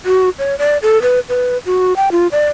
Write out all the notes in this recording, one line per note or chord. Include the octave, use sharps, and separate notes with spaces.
F#4
C#5
D5
A4
B4
B4
F#4
G5
F4
D5